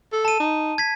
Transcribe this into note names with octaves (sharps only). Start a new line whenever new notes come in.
A4
A5 D#7
D#4
G#6 B6